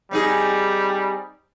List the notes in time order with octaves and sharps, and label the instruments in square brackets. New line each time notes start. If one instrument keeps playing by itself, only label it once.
[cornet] G3 [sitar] C4 D#4 G#4